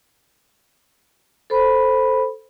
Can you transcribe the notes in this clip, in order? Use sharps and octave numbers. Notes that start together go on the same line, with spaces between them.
A4 C5 B5